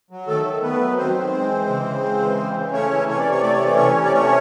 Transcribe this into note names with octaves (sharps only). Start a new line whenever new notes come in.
F#3
D#3 A3 A4
D#3
A3 B3 B4
F#3
D#3 C4 C5
D#3
G#3
E3
C#3
C#3
G#3
E3
C#3
C#3
A3 C#4 C#5
E3
C3 C#5
D5
C3
C#5
A3 D5
C#5
E3 D5
C3 C#4 C#5
C3
D5
A3 C#4 C#5